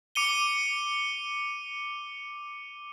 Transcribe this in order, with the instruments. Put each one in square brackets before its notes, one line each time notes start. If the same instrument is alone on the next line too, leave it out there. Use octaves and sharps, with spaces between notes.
[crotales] D6 C#7 D#7 G7